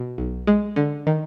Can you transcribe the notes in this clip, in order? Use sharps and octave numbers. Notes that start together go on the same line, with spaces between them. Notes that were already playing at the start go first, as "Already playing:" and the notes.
Already playing: B2
B1
G#3
D3
D#3